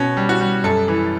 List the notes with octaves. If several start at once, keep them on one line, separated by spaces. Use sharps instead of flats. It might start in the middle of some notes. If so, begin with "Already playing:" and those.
Already playing: B2 C#4
G3
F#4
G3
F#2 A4
E3